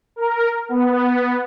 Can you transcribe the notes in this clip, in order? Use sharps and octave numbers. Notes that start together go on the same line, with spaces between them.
A#4
B3